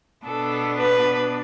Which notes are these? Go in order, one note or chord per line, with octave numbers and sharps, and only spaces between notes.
B2 B3 D4 A4
B4